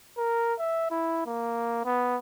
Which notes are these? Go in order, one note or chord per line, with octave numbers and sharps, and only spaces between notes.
A#4
E5
E4
A#3
B3